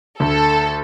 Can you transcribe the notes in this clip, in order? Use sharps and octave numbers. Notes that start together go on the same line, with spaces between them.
D2 A4